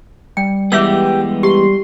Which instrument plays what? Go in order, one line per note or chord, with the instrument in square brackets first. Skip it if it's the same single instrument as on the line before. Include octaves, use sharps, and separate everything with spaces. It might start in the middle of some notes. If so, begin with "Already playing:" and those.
[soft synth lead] G3 [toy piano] G5
[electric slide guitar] E3 G#3 B3 [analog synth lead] G4 [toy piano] E5 E6
[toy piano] G4 [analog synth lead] C6